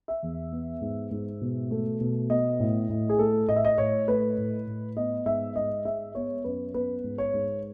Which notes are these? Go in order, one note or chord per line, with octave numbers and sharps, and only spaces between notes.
E5
E2
B3
G#2
G#2
B2
A3
B2
B3 D#5
A2
A2
G#4
A3 A4
A2 D#5
E5
D#5
A2 C#5
A3 B4
A2
A2
B3 D#5
G#2 E5
G#2 D#5
G#3 E5
B3 C#5
F#2 B4
B3 B4
G#2
C#5
G#2